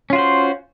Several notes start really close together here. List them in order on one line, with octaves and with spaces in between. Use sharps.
C#4 F4 F#4 C5